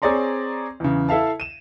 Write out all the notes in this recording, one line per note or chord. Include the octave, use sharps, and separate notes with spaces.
C4 G#4 C#5 D5 A#5 C6
E2 C#3
E4 A4 E5 F5 A5
D#7 E7